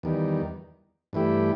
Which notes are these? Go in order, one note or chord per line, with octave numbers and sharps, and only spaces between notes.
E2 D#3 G3
G2 E3 A3 E4 G4